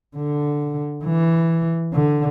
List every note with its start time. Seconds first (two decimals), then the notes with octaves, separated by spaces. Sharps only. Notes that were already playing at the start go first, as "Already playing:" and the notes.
0.16 D3
1.05 E3
1.94 D3